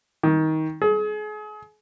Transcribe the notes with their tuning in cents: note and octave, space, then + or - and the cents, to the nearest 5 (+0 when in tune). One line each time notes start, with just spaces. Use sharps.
D#3 +20
G#4 +35